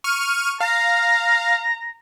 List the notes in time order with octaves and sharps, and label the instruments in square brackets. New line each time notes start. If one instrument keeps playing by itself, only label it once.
[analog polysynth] C#6 F6 D#7
[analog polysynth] F5 [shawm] A#5